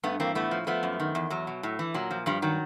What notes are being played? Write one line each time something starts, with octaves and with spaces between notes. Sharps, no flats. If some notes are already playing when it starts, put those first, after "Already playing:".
G2 A3 B3
E3 A#3 C4
A2 A3 B3
F3
F3 A3 B3
F#2
D#3
E2
E2 F#3
B2
A2
E3
A#2 F#3
F3
G2 F3 G3
D#3 F#3